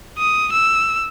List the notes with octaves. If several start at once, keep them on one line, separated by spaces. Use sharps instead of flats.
D#6
E6